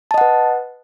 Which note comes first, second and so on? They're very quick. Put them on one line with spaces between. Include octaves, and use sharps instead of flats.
A5 D#5 F#5 B4